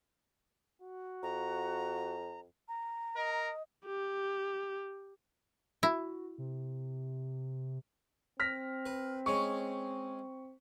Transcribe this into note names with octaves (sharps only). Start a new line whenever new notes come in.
F#4
F2 A#5
A#5
A#4 D#5
G4
E4 F#4
C3
C4 F6 A#6 B6
B4
G#3 C#4 C#6